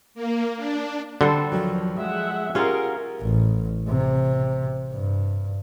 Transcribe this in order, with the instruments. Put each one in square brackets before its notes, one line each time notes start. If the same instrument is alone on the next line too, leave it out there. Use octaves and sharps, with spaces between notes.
[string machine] A#3
D4
[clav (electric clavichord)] D3 [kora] G3 A4 C5
[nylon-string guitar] D#2 F3 F#3
[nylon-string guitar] F3 [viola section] G#3 E5 F#5
[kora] C#4 F4 [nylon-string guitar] G4 F5 F#5 [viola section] G#4 A#4
[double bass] A1
C3
G2